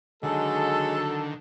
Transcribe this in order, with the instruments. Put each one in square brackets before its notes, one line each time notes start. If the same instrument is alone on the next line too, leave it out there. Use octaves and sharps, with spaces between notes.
[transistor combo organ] D3 D#3 [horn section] F#3 F#4 A4 [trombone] G#3